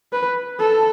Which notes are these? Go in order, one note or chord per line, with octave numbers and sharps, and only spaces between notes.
B4
A4